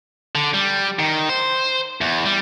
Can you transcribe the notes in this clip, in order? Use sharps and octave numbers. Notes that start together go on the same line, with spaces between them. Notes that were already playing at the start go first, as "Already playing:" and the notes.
D3
G3
D#3
C5
E2
G3